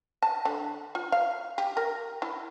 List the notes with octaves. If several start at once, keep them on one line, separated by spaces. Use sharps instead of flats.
A5
D3
F4
F5
G4
A#4
E4